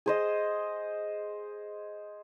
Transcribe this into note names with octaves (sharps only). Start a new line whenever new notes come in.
G#4 C5 D#5